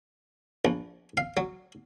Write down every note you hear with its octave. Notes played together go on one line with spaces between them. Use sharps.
A#1
F5
F#3